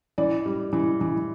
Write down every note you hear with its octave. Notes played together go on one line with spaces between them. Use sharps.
E3 D5
G3
E3
E3